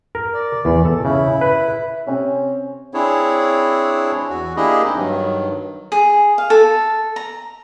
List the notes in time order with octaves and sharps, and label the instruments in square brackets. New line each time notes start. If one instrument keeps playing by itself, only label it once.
[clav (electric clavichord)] A#4
[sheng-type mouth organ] D5
[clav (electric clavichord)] E2
A4
[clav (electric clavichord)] C#3 [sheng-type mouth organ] E4
[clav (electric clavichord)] B4
[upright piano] C3 C4 [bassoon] C#4
[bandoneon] C4 D4 E4 G#4 C#5
E2 F#4
A#3 D4 E4 G4 G#4 D#5
C4 D#4
G2 D#3 F#3
[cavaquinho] G#4
F5
A4
A#5